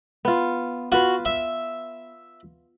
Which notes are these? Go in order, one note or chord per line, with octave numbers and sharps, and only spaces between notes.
B3 F4
F4 F#4 B4
E5